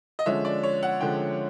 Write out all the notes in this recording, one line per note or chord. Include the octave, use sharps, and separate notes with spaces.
D#5
D3 F3 G#3 C#4 E5
D5
C#5
F#5
D3 F3 G#3 C#4 G5